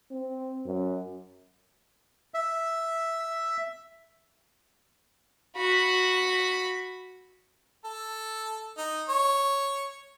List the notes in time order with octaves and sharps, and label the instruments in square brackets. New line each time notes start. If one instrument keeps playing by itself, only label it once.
[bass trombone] C4
F#2
[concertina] E5
[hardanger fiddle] F#4 B5
[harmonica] A4
D#4
C#5